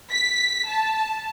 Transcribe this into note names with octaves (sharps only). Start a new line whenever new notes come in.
B6
A5